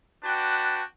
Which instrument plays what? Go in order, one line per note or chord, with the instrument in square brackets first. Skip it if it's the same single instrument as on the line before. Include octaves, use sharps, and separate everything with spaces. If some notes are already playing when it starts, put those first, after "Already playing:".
[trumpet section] D4 F#4 B4 G5 A5